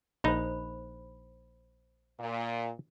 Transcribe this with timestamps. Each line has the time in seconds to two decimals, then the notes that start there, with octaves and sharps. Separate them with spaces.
0.24 A#1 D#4 C5 B5
2.19 A#2